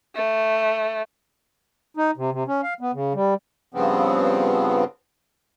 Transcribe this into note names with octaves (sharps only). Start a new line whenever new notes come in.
A3
D#4
C3
C3
C#4
F5
B3
C#3
G3
G2 C#3 F3 B3 C4